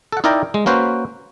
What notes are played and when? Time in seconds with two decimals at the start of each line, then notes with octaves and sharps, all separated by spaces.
0.12 A4 F#5
0.24 D#4 E4 A#4 D5 G5 A#5
0.54 G#3
0.66 A#3 C#4 F#4 B4 C5